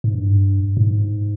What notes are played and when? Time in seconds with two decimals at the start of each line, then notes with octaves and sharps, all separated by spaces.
0.04 G#2
0.13 G2
0.77 A2
0.81 G#2